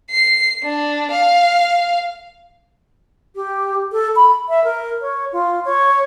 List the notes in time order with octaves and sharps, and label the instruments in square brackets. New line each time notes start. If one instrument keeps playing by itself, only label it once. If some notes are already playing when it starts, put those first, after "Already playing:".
[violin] C7
D4
F5
[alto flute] G4
A4
B5
E5
A#4
C#5
F4
C#5